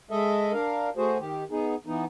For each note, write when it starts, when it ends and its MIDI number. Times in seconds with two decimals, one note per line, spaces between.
0.11 0.53 56
0.11 0.53 69
0.11 0.53 75
0.11 0.53 76
0.53 0.89 62
0.53 0.89 70
0.53 0.89 77
0.97 1.18 57
0.97 1.18 66
0.97 1.18 68
0.97 1.18 72
1.19 1.44 51
1.19 1.44 67
1.51 1.75 59
1.51 1.75 63
1.51 1.75 68
1.87 2.05 52
1.87 2.05 59
1.87 2.05 63